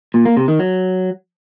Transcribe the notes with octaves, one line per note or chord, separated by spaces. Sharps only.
A#2
A#3
C3
D#3
F#3